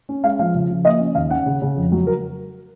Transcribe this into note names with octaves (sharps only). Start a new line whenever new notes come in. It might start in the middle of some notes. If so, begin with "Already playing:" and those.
C#4
G#3 F5
F3 F5
C#3
F3
A#3 D#5
C#4
D#2 F5
C#4 F#5
C#3
C#3
F2
F#3
A#4